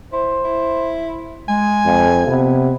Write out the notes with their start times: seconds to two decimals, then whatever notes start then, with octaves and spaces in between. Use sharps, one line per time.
0.13 E4 C5
0.45 E4
1.49 G#3 G#5
1.86 F2
2.27 C3 B3